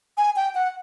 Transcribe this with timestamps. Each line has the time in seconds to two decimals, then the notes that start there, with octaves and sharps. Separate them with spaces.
0.17 G#5
0.36 G5
0.55 F#5